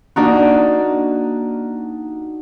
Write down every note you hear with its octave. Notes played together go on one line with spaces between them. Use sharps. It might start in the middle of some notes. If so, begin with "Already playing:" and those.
A#3 D4 D#4 F#4